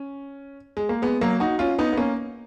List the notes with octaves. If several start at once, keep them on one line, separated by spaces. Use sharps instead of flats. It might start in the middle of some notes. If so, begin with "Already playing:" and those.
Already playing: C#4
G#3
A#3
G#3 B3
F#3 A#3
D#4 F#4
C#4 F4
B3 D#4
B3
A#3 C#4